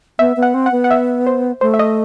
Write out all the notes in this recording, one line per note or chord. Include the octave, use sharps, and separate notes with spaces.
B3 E5
B3
F#5
C4
F#5
B3
F#5
E5
C5
A3 C5
E5
D#5